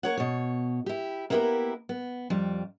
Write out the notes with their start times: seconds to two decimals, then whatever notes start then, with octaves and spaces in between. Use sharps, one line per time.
0.03 A#3 C#5 F#5
0.17 B2 C#5
0.86 E4 G4
1.30 A#3 B3 E4 F#4 G4 A#4
1.89 B3
2.30 F2 G3